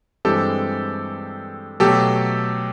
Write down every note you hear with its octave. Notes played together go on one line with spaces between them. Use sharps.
G2 E3 G#3 C4 G4 A4
B2 F#3 A3 G4 A4